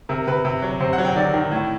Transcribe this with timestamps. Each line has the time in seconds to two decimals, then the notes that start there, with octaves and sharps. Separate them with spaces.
0.09 C3 A#4
0.27 C3 B4
0.45 C3
0.62 F#3
0.80 C3 C5
0.93 F#5
0.98 F#3
1.05 G5
1.16 D#3 D5
1.34 D#3
1.52 A2